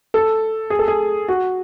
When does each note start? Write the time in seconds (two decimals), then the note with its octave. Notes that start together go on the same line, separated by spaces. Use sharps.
0.14 A4
0.70 G#4
0.79 A4
0.88 G#4
1.28 F#4